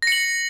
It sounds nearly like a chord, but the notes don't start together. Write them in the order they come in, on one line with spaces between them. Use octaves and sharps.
A#6 C#7 F#7